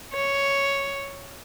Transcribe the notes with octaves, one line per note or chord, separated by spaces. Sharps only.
C#5